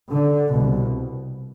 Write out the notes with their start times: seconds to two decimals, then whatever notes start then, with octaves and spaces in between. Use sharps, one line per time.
0.10 D3
0.53 C2 B2